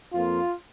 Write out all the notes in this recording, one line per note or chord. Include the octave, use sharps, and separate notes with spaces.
F2 F3 A#3 F4